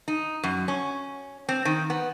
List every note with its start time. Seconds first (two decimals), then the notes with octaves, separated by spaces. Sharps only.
0.08 D#4
0.43 F#2
0.68 C#4
1.49 C4
1.65 D#3
1.90 B3